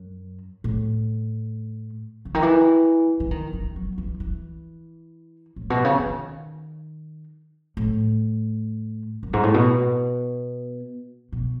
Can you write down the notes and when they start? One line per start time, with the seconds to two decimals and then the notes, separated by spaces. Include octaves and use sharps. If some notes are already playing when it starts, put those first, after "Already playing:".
Already playing: F#2
0.64 A2
2.25 C#3
2.34 D#3
2.42 E3
3.20 E3
3.31 D#3
3.53 E3
3.76 F#3
3.98 E3
4.20 E3
5.56 A2
5.70 B2
5.84 C#3
5.98 D#3
7.77 A2
9.23 F#2
9.33 G#2
9.43 A2
9.54 B2
11.32 B2